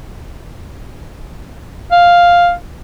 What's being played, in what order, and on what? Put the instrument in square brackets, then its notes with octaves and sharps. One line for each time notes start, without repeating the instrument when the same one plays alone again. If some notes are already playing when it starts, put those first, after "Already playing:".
[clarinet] F5